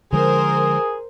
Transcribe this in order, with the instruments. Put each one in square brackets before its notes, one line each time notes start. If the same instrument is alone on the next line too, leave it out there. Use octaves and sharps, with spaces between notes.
[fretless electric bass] D3 F3 G#3 [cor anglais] G#4 [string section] A#4 C5